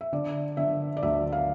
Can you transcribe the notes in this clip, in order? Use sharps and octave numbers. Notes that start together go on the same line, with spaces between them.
E5
D3 D5
D3 E5
D5
D2 E5
F5